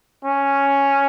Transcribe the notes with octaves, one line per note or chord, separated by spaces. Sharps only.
C#4